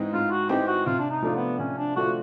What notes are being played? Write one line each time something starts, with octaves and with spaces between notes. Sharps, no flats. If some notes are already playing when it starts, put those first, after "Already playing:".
Already playing: G#2 E3 G#3 C4 D#4
G#2 F4
F#4
E3 G#3 C4 D#4 G4
F#4
C3 F4
D4
D#4
F3 A3 D4 F4
B3
C3 C#4
D4
F3 A3 D4 F4 F#4